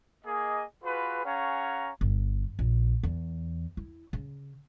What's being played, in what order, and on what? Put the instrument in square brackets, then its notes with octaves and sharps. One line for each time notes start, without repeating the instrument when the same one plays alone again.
[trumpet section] A#3 G#4 D#5
F4 F#4 G#4 B4
C#4 G#4 C#5 F5 F#5 A#5
[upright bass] G1
A#1
E2
E4
C#3